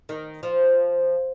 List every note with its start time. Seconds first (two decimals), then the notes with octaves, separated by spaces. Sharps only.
0.09 D#3
0.43 F3